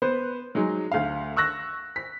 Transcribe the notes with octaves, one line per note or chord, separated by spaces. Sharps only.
B3 B4 C5
F#3 G#3 D#4
D2 F5
C#6 E6 F#6 A#6
B6